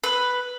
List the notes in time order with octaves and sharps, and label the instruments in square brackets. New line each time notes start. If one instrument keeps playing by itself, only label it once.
[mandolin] B4